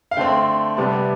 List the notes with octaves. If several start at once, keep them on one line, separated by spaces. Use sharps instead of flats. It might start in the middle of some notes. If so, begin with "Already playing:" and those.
F5
D3 A3 C4 G5
C3 G3 B3 A5